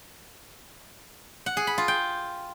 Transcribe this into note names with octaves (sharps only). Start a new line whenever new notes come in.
F#5
G#4
B5
F4
G5